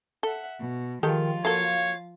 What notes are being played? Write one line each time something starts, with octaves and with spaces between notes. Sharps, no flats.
A4 E5 F#5
B2
D#3 F3 G#3 F4 G4 A4
F#3 A#3 A4 C#5 F5